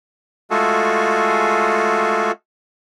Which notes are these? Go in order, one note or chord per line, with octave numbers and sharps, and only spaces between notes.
G#3 A3 F4 F#4 G#4 A4